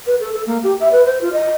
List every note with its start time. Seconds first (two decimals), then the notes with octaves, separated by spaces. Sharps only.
0.05 B4
0.19 A4
0.32 A4
0.46 A#3
0.63 G4
0.79 E5
0.91 B4
1.05 C5
1.21 F4
1.32 D#5